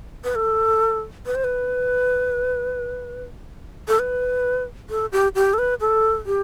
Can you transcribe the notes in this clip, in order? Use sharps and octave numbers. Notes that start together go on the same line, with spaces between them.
B4
A4
B4
C5
B4
A4
B4
A4
G4
G4
A4
B4
A4
G4